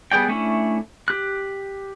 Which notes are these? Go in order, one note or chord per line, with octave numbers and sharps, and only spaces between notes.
G3 B3 G#4 D5 G5
A3 C#4 D4 E4
G4 F#6